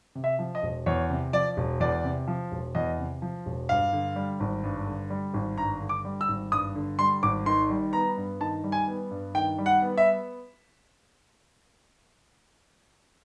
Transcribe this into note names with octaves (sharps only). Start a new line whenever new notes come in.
C3
E5
F3
D#5
E1
E2 C#5
C3
F3 D5
E1
E2 D5
C3
F3
E1
E2 D#5
C3
F3
E1
G2 F5
D3
G3
G#1
G2
D3
G3
G#1
G2 A#5
D3
D6
G3
E6
G#1
G2 D#6
D3
G3 C6
G#1 D6
D#3 C6
G3
B3 A#5
G2
D#3 A5
G3
G#5
B3
G2
D#3 G5
G3
F#5
B3
E5